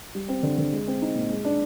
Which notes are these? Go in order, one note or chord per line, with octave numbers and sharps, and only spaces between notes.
G3
C4
D3
D3
G#3
C4
D#4
A#2
G#3
D4